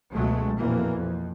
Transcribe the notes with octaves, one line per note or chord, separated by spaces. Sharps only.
C#2 B2 F#3 G#3 A3
A#1 F2 B2 E3 A#3
F2